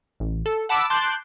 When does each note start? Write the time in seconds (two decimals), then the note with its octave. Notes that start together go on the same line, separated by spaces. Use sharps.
0.20 A1
0.46 A4
0.69 F#5 A5 B5 D6 E6
0.90 A5 C6 D6 F#6 G6